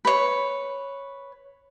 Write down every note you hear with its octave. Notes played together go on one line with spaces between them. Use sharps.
B4 C#5